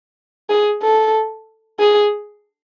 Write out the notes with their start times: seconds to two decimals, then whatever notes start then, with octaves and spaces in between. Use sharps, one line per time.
0.50 G#4
0.83 A4
1.79 G#4